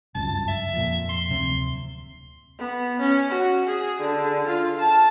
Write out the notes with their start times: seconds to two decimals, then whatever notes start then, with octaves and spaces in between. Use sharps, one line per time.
0.15 G1 C#2 F#2 A5
0.48 E5
0.73 F2 A#2
1.09 C6
1.30 D1 C3
2.59 B3
3.00 C#4
3.31 F#4
3.67 G#4
4.01 D3
4.48 F4
4.79 A5